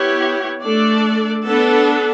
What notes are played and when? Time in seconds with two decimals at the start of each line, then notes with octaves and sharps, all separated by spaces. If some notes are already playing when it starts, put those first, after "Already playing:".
Already playing: B3 E4 G4 C#5
0.63 A3 D4 A4 D5
1.45 B3 D4 A4